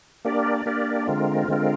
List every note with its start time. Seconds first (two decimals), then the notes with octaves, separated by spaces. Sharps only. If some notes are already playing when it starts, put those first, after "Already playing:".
0.25 A#3 D4 G4 A#4 D5
0.66 A#3 D4 G4 A#4 D5
1.07 D3 G#3 C4 F4 A#4
1.48 D3 G#3 C4 F4 A#4